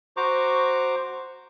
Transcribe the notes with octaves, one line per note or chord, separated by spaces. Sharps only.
F#4 C5 A#5 C#6 D6